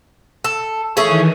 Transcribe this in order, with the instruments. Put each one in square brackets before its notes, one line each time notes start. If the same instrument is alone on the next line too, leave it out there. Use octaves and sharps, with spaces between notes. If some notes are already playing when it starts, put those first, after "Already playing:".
[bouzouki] A4
[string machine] D#3 E3 [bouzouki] A3 C#4 G#4